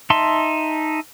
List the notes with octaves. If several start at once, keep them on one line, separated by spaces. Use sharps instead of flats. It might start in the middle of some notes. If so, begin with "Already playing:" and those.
D#4 E5 A5 C6